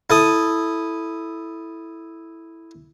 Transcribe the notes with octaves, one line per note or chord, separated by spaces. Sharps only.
E4 A4 D#6